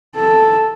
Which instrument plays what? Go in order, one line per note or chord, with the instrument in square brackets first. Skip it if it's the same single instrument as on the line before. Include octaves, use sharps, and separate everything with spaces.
[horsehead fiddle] A4